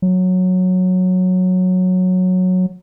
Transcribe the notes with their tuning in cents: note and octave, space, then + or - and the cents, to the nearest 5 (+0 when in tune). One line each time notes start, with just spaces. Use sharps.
F#3 -10